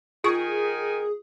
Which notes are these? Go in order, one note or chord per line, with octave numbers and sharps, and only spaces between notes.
D#3 F4 G#4 G#5 C#6